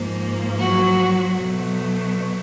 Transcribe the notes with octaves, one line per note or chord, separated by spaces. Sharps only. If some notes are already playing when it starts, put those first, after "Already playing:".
Already playing: G#2 F3 A#3
F#3 F#4
B2 F#3 A3